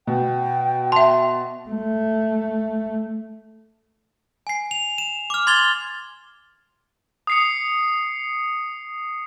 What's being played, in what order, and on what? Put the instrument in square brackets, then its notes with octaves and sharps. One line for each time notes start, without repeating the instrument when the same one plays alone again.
[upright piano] B2 [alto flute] G5
[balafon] E5 A5 [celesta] C6
[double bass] A3
[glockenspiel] G#5 C7
F7
E7
D6 F6
C6 G#6 A6 F7 G7
[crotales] D#6 C7 C#7